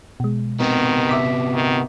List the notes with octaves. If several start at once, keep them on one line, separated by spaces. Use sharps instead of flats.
B2 G#3
C3 D#3 B3
E5 D6 B6
D#3